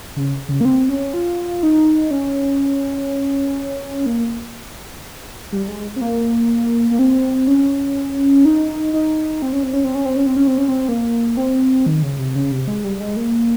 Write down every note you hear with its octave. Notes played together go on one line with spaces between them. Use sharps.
C#3
C#3
A#3
C4
C#4
F4
D#4
C#4
A#3
G3
G#3
C4
A#3
A#3
C4
C#4
D#4
D#4
C4
C#4
C4
C#4
C4
C#4
C4
C#4
C4
C#4
C4
C#4
C4
A#3
C4
D#3
C#3
C3
C#3
C3
G#3
G3
G#3
A#3